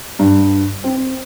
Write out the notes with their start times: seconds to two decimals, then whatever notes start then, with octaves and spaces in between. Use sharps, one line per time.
0.19 G2
0.84 C4